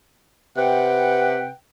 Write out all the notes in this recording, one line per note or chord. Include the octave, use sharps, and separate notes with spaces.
C3 B4 F#5 G5